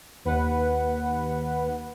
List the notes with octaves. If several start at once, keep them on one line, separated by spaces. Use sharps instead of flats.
D#2 B4 F#5